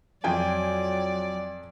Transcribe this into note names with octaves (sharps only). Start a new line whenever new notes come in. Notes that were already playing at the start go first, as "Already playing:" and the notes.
F2 F#3 D5 G5 G#5